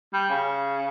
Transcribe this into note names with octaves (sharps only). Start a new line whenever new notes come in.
G3
C#3